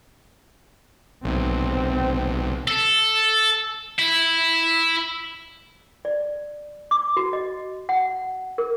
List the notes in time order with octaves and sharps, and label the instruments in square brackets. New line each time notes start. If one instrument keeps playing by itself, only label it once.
[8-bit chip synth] B1 [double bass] C4
[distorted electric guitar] A4
E4
[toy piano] D5
D6
F#4
D#5
F#5
A#4